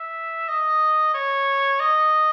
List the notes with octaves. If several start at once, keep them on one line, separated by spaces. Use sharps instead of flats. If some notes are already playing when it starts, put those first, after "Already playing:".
Already playing: E5
D#5
C#5
D#5